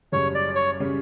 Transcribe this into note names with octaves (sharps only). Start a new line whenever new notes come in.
F#1 F#2 C#3 G3 C#4 C#5
D5
C#5
C#3 G3 C#4